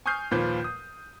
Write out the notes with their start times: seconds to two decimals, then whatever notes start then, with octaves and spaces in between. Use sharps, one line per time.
0.06 G#5 C#6 D#6 F6 G6 C7
0.31 D#2 A#2 F3 B4 G6
0.64 D#6